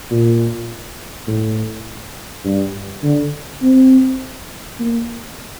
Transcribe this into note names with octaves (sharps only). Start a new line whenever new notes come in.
A#2
A2
G2
D3
C4
A#3